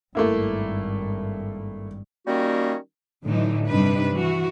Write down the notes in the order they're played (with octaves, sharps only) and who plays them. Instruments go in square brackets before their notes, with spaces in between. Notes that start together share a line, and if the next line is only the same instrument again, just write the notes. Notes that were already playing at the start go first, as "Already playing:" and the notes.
[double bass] G#1 G2 [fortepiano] A3 A#3 E4
[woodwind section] D#3 G3 A#3 C#4 F#4
[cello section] A2 D3 E3 F#3 D#4
G2 C3 G3 D4 D#4 B4
E3 F#4